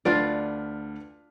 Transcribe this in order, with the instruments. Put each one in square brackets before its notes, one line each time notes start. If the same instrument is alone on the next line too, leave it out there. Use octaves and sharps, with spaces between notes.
[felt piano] D2 B4 F6 [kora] D4 F4 D5